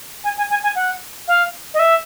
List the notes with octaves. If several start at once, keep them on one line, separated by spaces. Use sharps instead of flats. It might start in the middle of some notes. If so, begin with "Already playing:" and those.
G#5
G#5
G#5
G#5
F#5
F5
D#5
E5